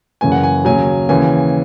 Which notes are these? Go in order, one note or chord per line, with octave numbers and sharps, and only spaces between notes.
F#1 F#2 C#3 E3 G#5
F#5
G#5
D#2 C#3 F#3 G#5
D#2 C#3 E3 G#5